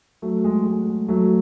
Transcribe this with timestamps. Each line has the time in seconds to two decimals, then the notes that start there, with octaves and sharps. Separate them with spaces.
0.22 F#3 A3
0.44 G#3
0.66 G#3
1.08 F#3 A3